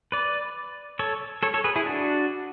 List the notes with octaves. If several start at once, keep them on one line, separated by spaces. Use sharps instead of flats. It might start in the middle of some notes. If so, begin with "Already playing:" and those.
B4 D5
A4 C#5
A4 C#5
A4 C#5
G#4 B4
E4 G#4
D4 F#4